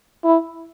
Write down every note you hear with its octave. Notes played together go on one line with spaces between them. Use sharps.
E4